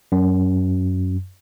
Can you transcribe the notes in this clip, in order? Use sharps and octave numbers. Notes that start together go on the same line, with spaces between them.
F#2